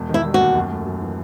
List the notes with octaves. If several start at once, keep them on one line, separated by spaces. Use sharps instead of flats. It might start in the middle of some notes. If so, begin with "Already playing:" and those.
Already playing: E1
D#3
E4
G3
F#4
D#2
F#2
A3
F#2
E3